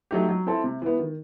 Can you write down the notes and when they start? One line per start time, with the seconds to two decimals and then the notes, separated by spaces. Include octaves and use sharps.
0.11 F#3 A3 D#4 G4
0.29 F#3
0.47 C4 E4 A4
0.64 C3
0.82 E3 B3
0.99 D#3